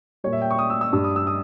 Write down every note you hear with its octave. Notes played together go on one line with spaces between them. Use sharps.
A#2 G3 C#5
E5
G5
C#6
D#6
E6
E6
G2 G3 E6
D#6
E6
D#6